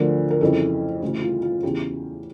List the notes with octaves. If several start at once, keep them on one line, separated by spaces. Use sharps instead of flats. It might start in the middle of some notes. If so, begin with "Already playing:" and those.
Already playing: D2 D3 F3 A#4
A#4
F2 C#3 E3 A4
D2 C#3 E3
F4
F4
E2 C#3 E3 G4